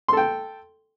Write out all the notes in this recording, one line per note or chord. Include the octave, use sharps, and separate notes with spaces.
A4 G5 C6